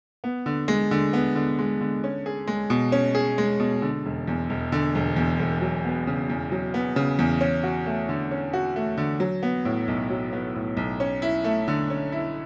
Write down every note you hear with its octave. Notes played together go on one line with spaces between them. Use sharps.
B3
D3
G#3
D3
B3
D3
G#3
D3
C#4
G#4
G#3
B2
C#4
G#4
G#3
B2
D3
E1
E2
E1
D3
E1
E2
E1
F#3
B3
C#3
E2
F#3
B3
C#3
E2
C#4
F#4
A3
D3
C#4
F#4
A3
D3
F#3
B3
A2
B1
F#3
B3
A2
B1
C#4
E4
A3
D3
C#4
E4